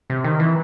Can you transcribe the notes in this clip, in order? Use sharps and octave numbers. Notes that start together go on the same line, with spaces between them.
C3
D#3
E3